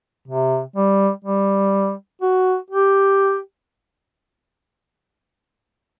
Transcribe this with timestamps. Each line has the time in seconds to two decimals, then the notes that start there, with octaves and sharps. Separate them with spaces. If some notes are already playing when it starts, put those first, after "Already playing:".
0.28 C3
0.76 G3
1.25 G3
2.22 F#4
2.70 G4